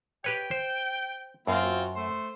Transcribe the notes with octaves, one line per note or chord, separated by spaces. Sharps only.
G4 B4 C#5 G5
C5
F#2 A#3 C4 F4
F#4
A3 C5